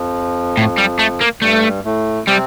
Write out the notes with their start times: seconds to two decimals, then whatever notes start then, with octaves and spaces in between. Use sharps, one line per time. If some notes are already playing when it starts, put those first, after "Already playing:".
Already playing: F2 F3
0.58 A2
0.78 G3
0.99 A3
1.21 A#3
1.42 G2 G3 A3
1.85 A2 A3
2.27 C3 G3 C4